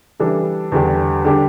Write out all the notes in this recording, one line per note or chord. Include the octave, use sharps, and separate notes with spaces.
E3 G3 D4 A4
E2 D3 G3 D4 G4
D3 G3 D4 G4